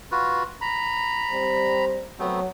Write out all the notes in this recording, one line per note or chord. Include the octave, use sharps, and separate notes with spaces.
F4 F#4 B4
A#5 B5
G3 C4 C5
F#3 A3 B3 C4